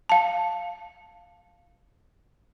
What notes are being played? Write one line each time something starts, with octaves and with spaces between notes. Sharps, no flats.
F5 A5